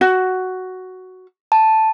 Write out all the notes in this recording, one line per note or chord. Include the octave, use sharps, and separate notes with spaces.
F#4
A5